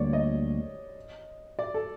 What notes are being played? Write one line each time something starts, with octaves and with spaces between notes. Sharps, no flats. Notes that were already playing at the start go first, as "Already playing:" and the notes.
Already playing: D2 D3 G3 A#3 C#5 D5
D#5
D5
A4